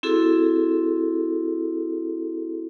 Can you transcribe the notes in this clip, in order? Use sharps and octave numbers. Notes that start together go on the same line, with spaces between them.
C4 E4 F#4 G#4 A4